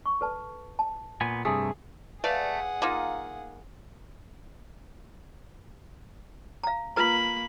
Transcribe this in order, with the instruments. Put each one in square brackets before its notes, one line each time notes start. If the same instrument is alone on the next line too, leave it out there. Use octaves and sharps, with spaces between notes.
[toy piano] C#6
A4 B4 A5
A5
[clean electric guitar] A#2 B3 G#5
[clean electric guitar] G2 C3 A3 [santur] G#4
[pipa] A3 [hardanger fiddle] G#4 F#5 [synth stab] B4 D5 F5
[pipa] A#3 D#4 F4
[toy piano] F5 A#5
[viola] A#3 B5 [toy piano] F4 B4 A#5